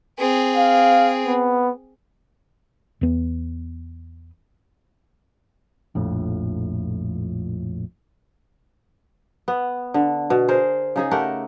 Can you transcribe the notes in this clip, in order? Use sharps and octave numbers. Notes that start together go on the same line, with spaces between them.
C4 G#4
F5
B3
E2 B3
A#1 F2 A2
B3
D3
B2
G#4 A#4 C5
C#3 D#4 G#4
A3 G4 A#4 F#5